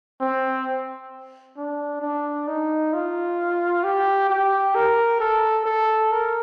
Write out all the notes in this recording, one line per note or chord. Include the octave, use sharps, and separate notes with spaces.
C4
D4
D4
D#4
F4
G4
G4
A#4
A4
A4
A#4